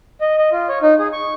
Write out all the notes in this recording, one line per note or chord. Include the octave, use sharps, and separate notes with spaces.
D#5
D#5
F4
C#5
D#4
G#4
C#6